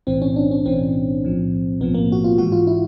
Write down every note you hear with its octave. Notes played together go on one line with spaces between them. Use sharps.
B1 A2 E3 C4
C#4
D4
C#4
B1 A2 E3 C4
B1 A2 F3
B1 A2 F3 B3
A#3
F#4
F4
G#2 E3 G#3 F#4
F4
E4